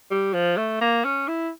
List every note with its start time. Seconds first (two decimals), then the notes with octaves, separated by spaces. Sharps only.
0.11 G3
0.34 F3
0.57 A3
0.81 A#3
1.05 C#4
1.28 E4